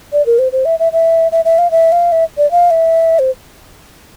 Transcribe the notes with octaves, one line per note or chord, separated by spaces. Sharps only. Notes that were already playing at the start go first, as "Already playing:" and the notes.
D5
A#4
C5
C5
E5
E5
E5
E5
E5
F5
E5
F5
E5
D5
F5
E5
C5